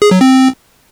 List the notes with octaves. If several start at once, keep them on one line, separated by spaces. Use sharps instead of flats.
G#4
F#3
C4